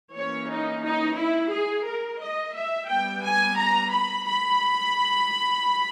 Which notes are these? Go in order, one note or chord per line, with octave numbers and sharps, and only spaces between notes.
E3 A#3 C#4 C#5
D#4
D#4
E4
G#4
A#4
D#5
E5
G3 B3 G5
G#5
A#5
B5
B5